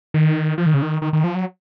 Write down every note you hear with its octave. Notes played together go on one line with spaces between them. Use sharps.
D#3
F3
D#3
C#3
D#3
D#3
D#3
F3
F#3